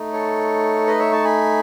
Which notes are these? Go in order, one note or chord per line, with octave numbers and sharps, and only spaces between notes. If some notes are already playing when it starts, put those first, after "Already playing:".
Already playing: A3 D#4
A4 C#5
B4 D#5
C#5 E5
A5 C#6
G#5 B5